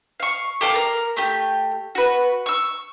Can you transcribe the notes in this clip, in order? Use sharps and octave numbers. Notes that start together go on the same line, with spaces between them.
F5 C#6
G4 A4 F5 D6
A#4
A3 G4
F#4 B4
C#6 E6